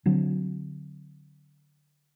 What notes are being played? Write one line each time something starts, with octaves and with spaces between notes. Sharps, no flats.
D3 F#3 C4